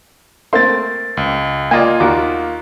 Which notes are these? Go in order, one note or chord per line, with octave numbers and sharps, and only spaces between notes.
A3 A#3 C4 C6 A6
C#2
A#3 F4 D5 D#5 G#5
D#2 F#4 D6